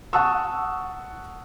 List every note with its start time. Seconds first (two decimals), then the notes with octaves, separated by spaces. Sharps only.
0.13 F#5 A5 C#6 D#6 E6